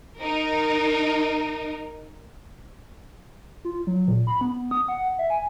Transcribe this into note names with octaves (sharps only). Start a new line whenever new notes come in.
D#4 A#4
F4
F#3
A#2
B5
B3
D#6
F#5
E5
G#5